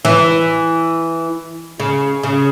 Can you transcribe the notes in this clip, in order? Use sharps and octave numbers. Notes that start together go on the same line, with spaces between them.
E3
C#3
C#3